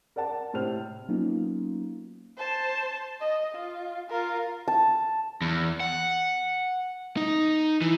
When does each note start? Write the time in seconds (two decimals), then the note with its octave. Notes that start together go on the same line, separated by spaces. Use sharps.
0.16 A#4 D5 F#5 A5
0.54 A2 C3 C5 F6 F7
1.09 F#3 A#3 B3 C#4 D#4 F4
2.38 C5 A5
3.21 D#5
3.55 F4
4.10 F4 A#4
4.68 A5
5.41 E2
5.80 F#5
7.17 D#4
7.81 E3